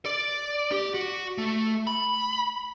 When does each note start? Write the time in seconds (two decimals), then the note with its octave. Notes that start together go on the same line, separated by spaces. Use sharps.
0.06 D5
0.72 G4
0.94 F#4
1.38 A3
1.87 B5